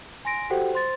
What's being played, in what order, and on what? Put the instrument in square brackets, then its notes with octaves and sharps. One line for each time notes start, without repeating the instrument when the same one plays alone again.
[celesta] G#5 C6 A#6 D7
F#4 G4 A4 C5 F#5 G5
C5 C6 A6